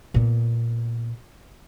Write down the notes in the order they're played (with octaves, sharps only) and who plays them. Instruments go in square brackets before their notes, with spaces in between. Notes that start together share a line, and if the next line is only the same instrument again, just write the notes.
[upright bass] A#2 B3